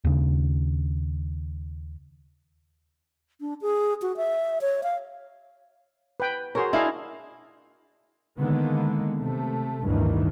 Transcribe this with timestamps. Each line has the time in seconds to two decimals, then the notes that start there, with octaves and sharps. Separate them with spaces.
0.05 D#2 C#3
3.41 D4
3.62 G#4
4.02 F#4
4.17 E5
4.61 C#5
4.83 F5
6.20 B4 G5
6.55 F#4 G#4 A#4 C5 C#5
6.73 D4 E4 G#4 D#5 F5
8.38 D3 D#3 G#3 A#3 B3
9.17 C3 A3
9.84 A1 D2 G2 D#3 E3